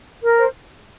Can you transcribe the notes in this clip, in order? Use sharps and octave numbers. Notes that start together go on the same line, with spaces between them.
A#4
C5